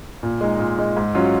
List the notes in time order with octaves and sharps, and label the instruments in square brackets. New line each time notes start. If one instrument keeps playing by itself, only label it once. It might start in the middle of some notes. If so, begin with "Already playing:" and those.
[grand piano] A#2
G#3 D#4
A#2
G#3 D#4
G#2
F#3 C#4 F4